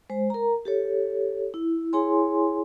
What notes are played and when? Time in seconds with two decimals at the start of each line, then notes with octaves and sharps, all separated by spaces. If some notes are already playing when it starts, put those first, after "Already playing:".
0.10 G#3 C5
0.30 A#4 A#5
0.65 G4 A4 C#5
1.54 E4
1.93 E4 G#4 C#5 G#5 C6